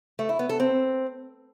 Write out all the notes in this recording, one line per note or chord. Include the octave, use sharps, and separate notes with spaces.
A3
E4
B3
A4
C4